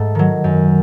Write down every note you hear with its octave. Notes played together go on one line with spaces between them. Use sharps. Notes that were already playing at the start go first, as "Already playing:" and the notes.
Already playing: G#2 A3 A4
D#3 F#3
F#2